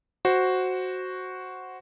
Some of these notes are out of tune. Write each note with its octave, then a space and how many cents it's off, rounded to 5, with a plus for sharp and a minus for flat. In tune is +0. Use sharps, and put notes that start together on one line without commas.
F#4 +0 C5 +0